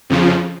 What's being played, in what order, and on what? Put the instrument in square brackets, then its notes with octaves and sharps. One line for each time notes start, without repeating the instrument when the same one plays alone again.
[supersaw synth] F2 C#3 F3